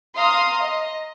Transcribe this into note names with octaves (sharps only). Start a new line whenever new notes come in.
F5 A#5 C6 D#6
D#5